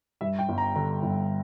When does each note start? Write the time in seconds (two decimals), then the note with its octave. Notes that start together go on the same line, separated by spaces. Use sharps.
0.21 G2 E5
0.39 G5
0.49 G1
0.58 A#5
0.76 D3 A#5
1.03 G1